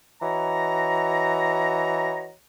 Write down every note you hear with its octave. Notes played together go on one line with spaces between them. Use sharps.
E3 F#4 C#5 D#5 A#5